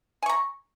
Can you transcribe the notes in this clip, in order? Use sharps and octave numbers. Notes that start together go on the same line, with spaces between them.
G#5 A#5 C#6